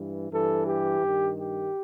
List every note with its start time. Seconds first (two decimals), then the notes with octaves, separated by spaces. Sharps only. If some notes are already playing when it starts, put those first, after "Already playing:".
Already playing: G2 E3
0.31 G2 E3 A4
0.66 G4
1.01 G2 D#3
1.37 G4